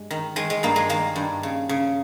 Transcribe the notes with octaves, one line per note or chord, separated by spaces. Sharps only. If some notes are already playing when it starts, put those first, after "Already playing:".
Already playing: G2 G#3
D#3
D#3 G#3
G#3
G2 A#3
G#3
D#3 A#3
G2
C#3
C#3